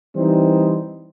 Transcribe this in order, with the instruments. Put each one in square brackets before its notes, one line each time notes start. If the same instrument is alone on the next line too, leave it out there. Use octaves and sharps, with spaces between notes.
[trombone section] E3 G3 C4 D#4